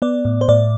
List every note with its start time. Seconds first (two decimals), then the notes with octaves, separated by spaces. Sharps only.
0.02 B3 D5
0.25 A2
0.41 C5
0.48 A2 D5